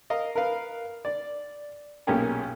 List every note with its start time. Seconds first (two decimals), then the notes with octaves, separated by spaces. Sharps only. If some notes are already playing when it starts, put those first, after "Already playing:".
0.10 A#4 D#5 F5
0.35 A#4 B4 F5
1.05 D5
2.07 B1 A#2 C#4 G4 G#4 A#4